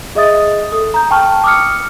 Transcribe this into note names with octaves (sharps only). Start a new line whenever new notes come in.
G#4 D#5 E5 D#6 A6
A4 D#6
A#5 G6
G5 A5 C#6 F6
D6 D#6 F6 C#7